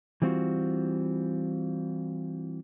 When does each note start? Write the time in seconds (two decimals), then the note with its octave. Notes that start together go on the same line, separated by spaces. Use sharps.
0.22 E3 G3 C4 F4 F#4